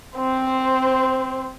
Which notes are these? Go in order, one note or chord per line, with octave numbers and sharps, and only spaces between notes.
C4 C5